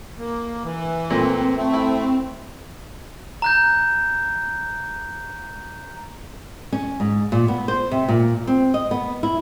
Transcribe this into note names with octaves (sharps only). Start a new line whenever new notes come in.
A#3
E3
A#2 A3 C4
A3
E4
A#5 F#6 G6
C#4
G#2
A#2
B3
C5
C3
A#2
C4
D#5
B3
E4